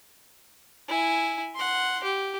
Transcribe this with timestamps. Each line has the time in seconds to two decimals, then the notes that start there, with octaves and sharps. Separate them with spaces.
0.89 E4 G#5
1.55 F#5 C6
2.03 G4